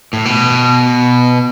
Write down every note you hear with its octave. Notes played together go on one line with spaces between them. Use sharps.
A2
B2